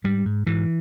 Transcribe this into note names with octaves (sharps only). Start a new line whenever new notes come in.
G#2 G3
G#2
G#2 E3